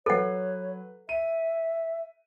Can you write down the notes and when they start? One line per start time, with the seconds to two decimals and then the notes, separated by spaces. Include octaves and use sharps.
0.06 F#3 A4 B4 C#5 F#5
1.09 E5 D#7